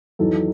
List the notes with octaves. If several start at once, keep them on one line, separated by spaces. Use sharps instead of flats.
E2 D#3 F#3 A4